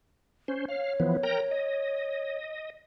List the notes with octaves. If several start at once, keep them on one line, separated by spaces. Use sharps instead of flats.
C#4 C5
C#5 F5
E3 F3 B3
A#4 G5 A#5
D#5